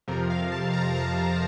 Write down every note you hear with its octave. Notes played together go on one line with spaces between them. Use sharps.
F2 C3 F3 A#4
F5
A5
A#5
A5